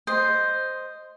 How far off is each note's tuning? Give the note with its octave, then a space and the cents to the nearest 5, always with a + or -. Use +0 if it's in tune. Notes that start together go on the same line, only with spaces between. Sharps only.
C5 +0 D#5 +0